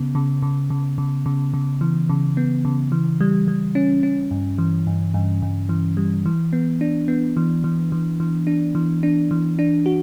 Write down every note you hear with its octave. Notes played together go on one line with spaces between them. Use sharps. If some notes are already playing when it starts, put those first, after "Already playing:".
Already playing: C#3 B3
C#3
C#3
C#3
C#3
C#3
C#3
E3
C#3
B3
C#3
E3
G3
G3
C#4
C#4
G2
E3
G2
G2
G2
E3
G3
E3
B3
D4
B3
E3
E3
E3
E3
D4
E3
D4
E3
D4
F#4